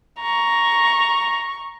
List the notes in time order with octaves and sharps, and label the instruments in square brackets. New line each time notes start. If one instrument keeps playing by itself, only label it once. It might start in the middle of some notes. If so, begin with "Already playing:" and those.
[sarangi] A#5 [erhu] C#6